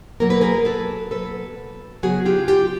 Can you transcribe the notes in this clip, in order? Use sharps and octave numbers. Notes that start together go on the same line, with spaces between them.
B2 F#3 A#3 A#4
B4
G#4 A#4
A4 B4
B2 F#3 A#3 A4 B4
C#3 F#3 B3 F#4 G#4
F4 G4
F4 G4